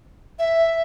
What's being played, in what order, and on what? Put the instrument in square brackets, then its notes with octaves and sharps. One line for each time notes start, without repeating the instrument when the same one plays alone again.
[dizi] E5